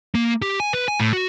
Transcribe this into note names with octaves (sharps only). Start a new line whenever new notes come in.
A#3
G4
G#5
B4
G#5
A2
F#4